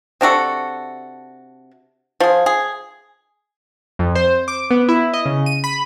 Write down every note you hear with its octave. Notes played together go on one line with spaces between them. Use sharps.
C3 D4 F#4 A4
F3 G#4
G#4
F2
C5
D6
B3
E4
D#5
C#3
D#7
B5